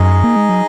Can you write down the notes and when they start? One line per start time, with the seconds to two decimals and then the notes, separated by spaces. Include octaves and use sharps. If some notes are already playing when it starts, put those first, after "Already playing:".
Already playing: F#2 D#4 G#4 D#5
0.24 A#3
0.36 G#3
0.49 F#3